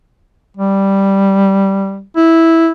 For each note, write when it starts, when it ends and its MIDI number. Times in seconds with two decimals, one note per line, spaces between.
0.57 2.02 55
2.16 2.72 64